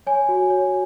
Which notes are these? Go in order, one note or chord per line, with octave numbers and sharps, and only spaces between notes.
C#5 G#5
F#4
C#5